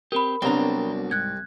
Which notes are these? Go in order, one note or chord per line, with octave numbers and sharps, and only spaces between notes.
C4 G4 A#4 B5
C2 F#3 B3 C4 D4 A#5
G#2 F#6 G#6